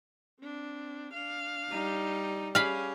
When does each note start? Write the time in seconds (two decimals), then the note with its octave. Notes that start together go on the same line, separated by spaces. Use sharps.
0.40 C4 D4
1.13 D4 F5
1.71 G3 D#4
2.55 C#4 G4 G#4 F5 B5